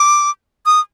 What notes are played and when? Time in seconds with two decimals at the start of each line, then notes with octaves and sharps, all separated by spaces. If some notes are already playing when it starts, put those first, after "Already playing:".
Already playing: D6
0.66 D#6